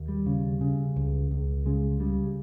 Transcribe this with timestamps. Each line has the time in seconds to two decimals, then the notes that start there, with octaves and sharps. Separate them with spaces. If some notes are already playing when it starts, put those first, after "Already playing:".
Already playing: D#2
0.08 G3
0.26 C#3
0.61 C#3
0.96 C#2
1.31 C#2
1.66 C#3 G#3
2.00 C#3 G3